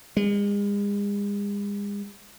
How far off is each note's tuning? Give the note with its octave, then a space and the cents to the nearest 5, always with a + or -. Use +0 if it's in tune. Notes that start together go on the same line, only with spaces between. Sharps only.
G#3 -40